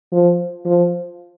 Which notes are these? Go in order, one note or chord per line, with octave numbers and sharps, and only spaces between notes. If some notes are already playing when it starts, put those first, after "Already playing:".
F3
F3